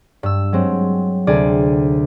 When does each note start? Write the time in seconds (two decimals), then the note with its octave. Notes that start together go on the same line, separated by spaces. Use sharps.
0.23 G2 E6
0.53 F#3 G#3 C4
1.27 D2 C3 G#4 D5